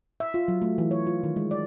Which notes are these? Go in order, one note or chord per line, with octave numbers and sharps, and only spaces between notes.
E5
F4
F#3
A3
E3
C#5
F4
D#3
G#3
D5